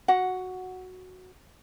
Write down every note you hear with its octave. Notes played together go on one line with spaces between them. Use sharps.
F#4 F#5